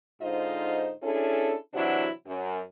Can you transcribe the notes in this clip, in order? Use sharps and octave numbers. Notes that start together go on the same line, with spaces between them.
G#2 D3 D#4 F4 C5 D#5
C#4 D4 E4 G#4 A4
C3 E3 F#3 D4 E4 F#4
F#2